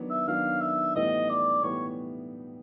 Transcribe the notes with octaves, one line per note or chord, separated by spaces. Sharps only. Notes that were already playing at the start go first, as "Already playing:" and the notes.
Already playing: D#3 F#3 B3 D4
E5
D#3 F#3 B3 D4 F5
E5
A2 E3 G3 B3 D#4 D#5
D5
A2 E3 G3 B3 C#5